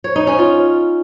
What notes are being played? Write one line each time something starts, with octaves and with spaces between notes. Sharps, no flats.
C#5
D#4
C#4
F4